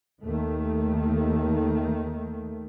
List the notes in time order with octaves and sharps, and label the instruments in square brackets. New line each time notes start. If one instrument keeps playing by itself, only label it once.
[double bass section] D#2 D#3 A3